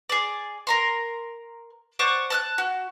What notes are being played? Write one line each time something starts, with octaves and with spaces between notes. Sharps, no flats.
G#4 D5
A#4 A#5 C6
C5 D5 F#5 C#6
A5 F6 F#6
F#4